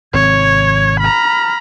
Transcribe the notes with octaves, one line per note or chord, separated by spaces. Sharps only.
G#1 C3 C4 C#5 G#6
A#5 B5 F6